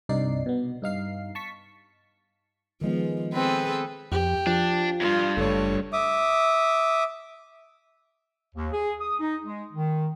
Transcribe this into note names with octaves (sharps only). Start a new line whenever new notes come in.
C2 G2 C3 D#4 D5 C7
B2 B3
G2 D#4 F5 C7
A5 C#6 B6
D#3 F3 G#3 B3
C4 G#4 A4 B4
F2 G4
F3 D4
E2 G2 F4
F#1 A3 C#5
E5 D6 D#6
D#2
G#4
D#6
D#4
G#3
D#3